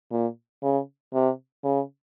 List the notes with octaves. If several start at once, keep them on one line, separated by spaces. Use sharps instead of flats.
A#2
C#3
C3
C#3